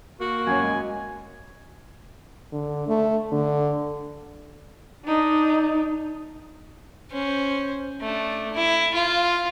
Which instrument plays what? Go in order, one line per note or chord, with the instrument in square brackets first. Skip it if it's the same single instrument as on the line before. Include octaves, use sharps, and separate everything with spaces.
[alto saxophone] A#3 [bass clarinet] F#4
[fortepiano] F#2 C#5 [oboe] G#5
[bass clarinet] G#3
[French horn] D3
A3
D3
[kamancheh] D4 D#4
[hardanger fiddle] C#4 C5
A3 D4
E4
F4